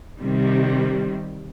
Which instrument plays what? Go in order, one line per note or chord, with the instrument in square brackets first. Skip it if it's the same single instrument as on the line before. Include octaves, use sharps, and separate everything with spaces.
[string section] C3 D#3 G3